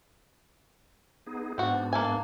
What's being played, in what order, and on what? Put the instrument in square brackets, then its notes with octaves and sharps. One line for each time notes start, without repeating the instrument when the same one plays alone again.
[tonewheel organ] B3 D#4 G#4
[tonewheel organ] G#2 B3 D4 [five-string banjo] C4 F#4
[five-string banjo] A#3 A4 G#5